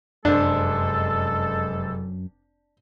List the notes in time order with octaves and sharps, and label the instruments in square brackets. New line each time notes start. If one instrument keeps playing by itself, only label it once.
[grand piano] F1 C5 [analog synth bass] F#2 [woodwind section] G#3 A4 [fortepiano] D4